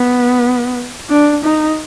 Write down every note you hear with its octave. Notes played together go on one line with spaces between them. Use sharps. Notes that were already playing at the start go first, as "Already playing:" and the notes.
Already playing: B3
D4
D#4